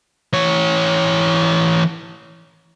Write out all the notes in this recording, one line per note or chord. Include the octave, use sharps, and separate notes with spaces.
E3 C#5